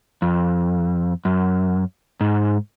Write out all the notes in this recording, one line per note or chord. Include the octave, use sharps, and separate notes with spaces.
F2
F#2
G#2